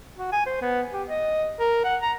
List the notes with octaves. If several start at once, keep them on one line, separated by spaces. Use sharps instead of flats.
F#4
G#5
C5
B3
G4
D#5
A#4
F#5
A#5